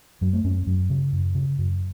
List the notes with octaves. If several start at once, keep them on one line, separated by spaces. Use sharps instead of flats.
F#2 F#3
A3
F#2 C#4
F#2 F#3
C#3
F#2
C#3
F#2